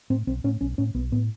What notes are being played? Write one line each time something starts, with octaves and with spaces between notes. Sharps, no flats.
A2 C4
B1 C4
A2 C#4
B1 C#4
A2 C#4
B1 B3
A2 B3